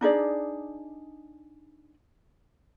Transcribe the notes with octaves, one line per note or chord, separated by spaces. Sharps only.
D4 D#4 G#4 D5